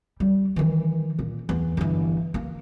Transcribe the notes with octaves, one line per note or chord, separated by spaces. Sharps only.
G3
D#3 E3
A#2
E2
G1 E3
A#3